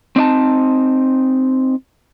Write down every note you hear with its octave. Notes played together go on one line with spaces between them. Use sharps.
C4 D#4 D5 A5